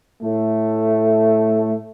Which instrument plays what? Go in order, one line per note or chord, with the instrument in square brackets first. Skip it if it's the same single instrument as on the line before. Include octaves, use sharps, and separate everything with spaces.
[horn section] A2 A3